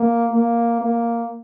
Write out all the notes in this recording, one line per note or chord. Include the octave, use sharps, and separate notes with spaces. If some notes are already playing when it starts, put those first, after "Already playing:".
Already playing: A#3
A#3
A#3